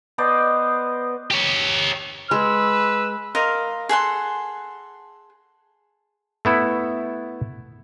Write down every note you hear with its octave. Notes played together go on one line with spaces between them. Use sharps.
B3 C5 D5 D#5
G4 C#5
G#3 B4 E6
A#4 D#5 F5 C6
G#4 A4 F#5 C6
A3 B3 E4